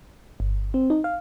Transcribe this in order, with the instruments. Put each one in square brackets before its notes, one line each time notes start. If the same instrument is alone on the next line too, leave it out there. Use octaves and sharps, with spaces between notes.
[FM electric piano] G1
C4
D#4
F5